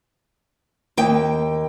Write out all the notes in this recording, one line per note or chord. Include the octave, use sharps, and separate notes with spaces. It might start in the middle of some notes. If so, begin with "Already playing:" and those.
D#2 G5